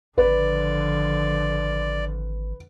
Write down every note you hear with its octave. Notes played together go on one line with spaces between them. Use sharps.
G#1 D3 F3 B4 D5